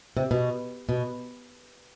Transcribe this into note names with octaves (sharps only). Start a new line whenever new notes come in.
C3
B2
B2